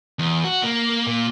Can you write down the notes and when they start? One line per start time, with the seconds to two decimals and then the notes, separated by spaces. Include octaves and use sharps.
0.19 E2
0.44 F#4
0.63 A#3
1.07 A#2